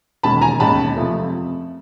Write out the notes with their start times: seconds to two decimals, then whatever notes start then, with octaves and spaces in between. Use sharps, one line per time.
0.23 E1 D#2 D#3 G#3 C#4 A5 B5
0.41 G#5 A#5
0.60 E1 D#2 D#3 G#3 C#4 A5 B5
0.97 F2 C3 F3 A3